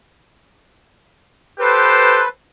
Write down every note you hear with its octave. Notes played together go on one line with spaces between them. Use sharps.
G4 A4 B4 C5